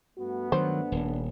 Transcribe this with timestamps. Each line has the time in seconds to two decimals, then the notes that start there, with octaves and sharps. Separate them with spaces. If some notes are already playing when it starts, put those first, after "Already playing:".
0.17 G2 A3 B3 F#4
0.52 D#3 F#3 D4 C5
0.92 D#1